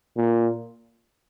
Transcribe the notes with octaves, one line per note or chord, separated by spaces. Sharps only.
A#2